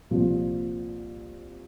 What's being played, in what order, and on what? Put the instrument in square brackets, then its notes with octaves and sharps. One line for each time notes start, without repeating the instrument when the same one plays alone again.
[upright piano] C2 A#2 F3